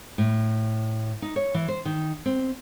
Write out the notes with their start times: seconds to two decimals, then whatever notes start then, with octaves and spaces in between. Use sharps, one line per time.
0.18 A2
1.22 D#4
1.36 C#5
1.54 E3
1.68 C5
1.85 D#3
2.26 C4